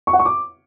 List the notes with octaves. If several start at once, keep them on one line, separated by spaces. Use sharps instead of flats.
C#6
F#5
C#6
D6